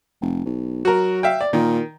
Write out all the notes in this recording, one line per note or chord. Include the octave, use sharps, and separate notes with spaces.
F1
B1
F#3 F#4 A#4
E5 F5 G5
D5
A#2 D#3